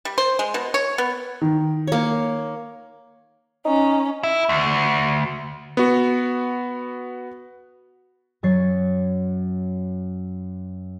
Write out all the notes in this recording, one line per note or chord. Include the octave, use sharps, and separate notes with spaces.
G3
C5
G#3
B2
C#5
B3
D#3
A#3 C#5
C#4 D#4
E4
D2
B3 F#4
F#2 F#3 C#5 A6 C7